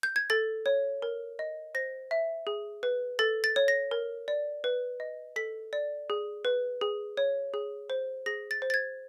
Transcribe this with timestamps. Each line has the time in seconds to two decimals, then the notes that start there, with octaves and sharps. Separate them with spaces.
0.03 G6
0.16 G#6
0.30 A4 A6
0.66 C#5
1.02 A#4
1.39 D#5
1.75 C5 A#6
2.11 E5
2.47 G#4
2.83 B4
3.19 A4 A6
3.44 A6
3.56 C#5
3.68 A#6
3.91 A#4
4.28 D5
4.64 B4
5.00 D#5
5.36 A4 B6
5.73 D5
6.10 G#4
6.45 B4
6.81 G#4
7.17 C#5
7.54 G#4
7.90 C5
8.26 G#4 A#6
8.51 A6
8.62 C5
8.70 A6
8.74 G#6